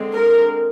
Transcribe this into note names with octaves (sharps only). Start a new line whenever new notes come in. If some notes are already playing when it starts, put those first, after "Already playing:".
Already playing: D3 G#3 C4
A#4